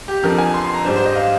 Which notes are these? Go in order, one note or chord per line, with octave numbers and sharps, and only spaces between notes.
G4
F2 D3 F3 A#4
G#5
C6
C6
A#5
G#2 G3 D4 C5
C5
D#5
F5